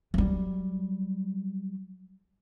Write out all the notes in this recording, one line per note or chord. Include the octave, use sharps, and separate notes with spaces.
F#3 G3